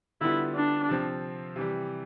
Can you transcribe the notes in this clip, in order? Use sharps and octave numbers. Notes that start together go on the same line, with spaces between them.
D3 G3 B3 E4 F4
D4
C3 F3 C4
C3 E3 G3